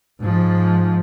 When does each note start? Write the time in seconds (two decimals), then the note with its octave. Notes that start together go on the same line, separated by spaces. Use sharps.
0.20 G#2 F3